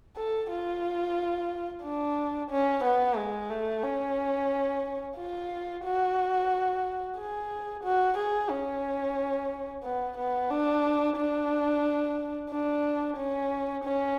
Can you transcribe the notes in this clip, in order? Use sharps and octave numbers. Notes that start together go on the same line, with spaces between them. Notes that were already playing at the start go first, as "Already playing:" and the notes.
A4
F4
D4
C#4
B3
G#3
A3
C#4
F4
F#4
G#4
F#4
G#4
C#4
B3
B3
D4
D4
D4
C#4
C#4